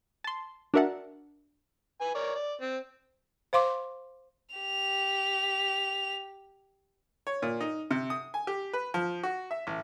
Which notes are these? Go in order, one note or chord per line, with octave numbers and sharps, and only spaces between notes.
A5 C6
D4 F#4 A#4 E5 F#5 A5
B4 G#5
A#4 C#5 D5
D5
C4
C5 F5 C6 D6
G4 F7
C#5
A#2
D#4
C3
D#6
G#5
G4
B4
F3
F#4
E5
A1